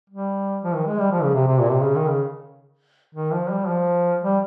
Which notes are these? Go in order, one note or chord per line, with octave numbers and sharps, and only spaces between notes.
G3
F3
D#3
G#3
G3
F3
C#3
C3
C3
A#2
C3
C#3
D#3
C#3
D#3
F3
G3
F3
G3